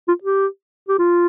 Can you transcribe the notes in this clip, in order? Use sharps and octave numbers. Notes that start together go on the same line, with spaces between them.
F4
G4
G4
F4